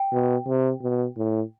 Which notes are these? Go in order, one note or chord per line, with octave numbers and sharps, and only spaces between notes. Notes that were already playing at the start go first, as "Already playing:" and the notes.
Already playing: G5
B2
C3
B2
A2